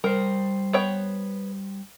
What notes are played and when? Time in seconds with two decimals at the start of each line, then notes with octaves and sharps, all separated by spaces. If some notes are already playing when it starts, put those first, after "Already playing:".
0.04 G3 A#4 C5
0.73 B3 C#5 G5